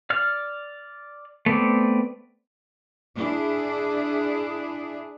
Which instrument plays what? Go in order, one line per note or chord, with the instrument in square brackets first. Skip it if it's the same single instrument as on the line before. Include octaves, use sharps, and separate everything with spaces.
[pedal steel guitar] D5 F6
A3 B3 C4 D5
[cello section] D4 E4 G#4